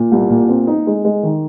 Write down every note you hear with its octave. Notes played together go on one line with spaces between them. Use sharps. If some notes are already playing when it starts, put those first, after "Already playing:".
Already playing: A#2
C2
A#2
C4
D#4
G#3
G#3
D#3